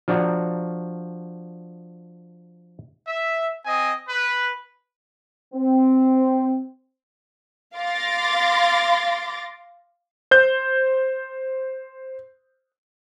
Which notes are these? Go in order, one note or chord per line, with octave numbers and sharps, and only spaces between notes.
F3 D4 F#4 D5 A#5
E5
C4 D#5 G#5
B4
C4
F5 C6 D6 A6 A#6
C5 G6